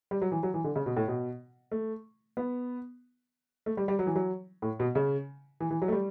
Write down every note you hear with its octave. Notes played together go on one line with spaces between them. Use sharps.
G3
F#3
E3
F#3
E3
D3
C#3
B2
A2
B2
A3
B3
A3
G3
G3
F#3
E3
F#3
A2
B2
C#3
E3
E3
F#3
A3
G3